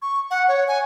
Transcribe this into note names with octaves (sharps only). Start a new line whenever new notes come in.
C#6
F#5
C#5
G#5